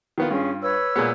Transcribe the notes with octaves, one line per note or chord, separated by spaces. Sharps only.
D#3 B3 F4
G2 C#4 F4 G#4
B4 C#5 E6
A#2 G#3 B3